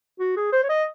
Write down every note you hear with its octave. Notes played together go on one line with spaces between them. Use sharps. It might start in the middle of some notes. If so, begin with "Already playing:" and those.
F#4
G#4
C5
C#5
D#5